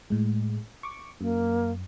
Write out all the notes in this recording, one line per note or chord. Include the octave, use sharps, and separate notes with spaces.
A2 G#3
C#6 D6
F#2 A#3